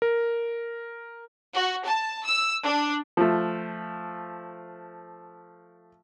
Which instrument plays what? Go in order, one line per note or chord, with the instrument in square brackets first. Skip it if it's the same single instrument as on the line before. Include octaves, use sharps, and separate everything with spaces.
[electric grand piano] A#4
[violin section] F#4
A5
E6
D4
[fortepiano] F3 A3